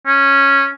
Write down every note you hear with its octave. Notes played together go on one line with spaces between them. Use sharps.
C#4